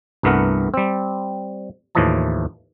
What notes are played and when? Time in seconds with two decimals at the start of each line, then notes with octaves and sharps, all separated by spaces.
0.23 C2 G2 A3 B3 A#4 F#5
0.74 G3 C4
1.95 D#2 A2 E3 F3 D#5 A5